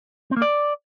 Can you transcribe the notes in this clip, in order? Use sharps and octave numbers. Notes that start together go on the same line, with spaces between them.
C4
A#3
D5